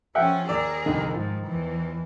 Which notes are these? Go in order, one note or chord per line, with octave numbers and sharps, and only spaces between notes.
F3 C#4 E5 F#5 G5
D#2 G#4 A#4 D5 E6
C2 F2 D3 D#3
G#2 F3
E2 E3